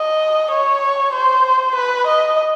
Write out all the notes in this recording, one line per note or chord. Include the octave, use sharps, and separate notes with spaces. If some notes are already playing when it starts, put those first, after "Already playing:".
Already playing: D#5
C#5
C5
B4
D#5